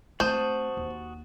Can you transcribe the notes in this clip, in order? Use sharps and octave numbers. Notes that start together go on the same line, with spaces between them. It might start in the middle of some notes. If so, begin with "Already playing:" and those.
A3 C4 F#4 C5 A5 D#6
D#2 D3